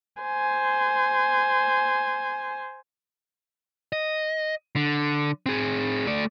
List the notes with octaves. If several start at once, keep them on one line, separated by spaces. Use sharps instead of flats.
C5 G#5
D#5
D3
C4 G#4
A3 D5